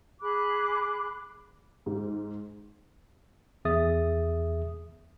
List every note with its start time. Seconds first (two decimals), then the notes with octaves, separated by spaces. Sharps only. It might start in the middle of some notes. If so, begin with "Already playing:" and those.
0.22 G#4 B5 D6 F#6
1.86 G#2
3.65 E2 G#4 E5 D#6 A6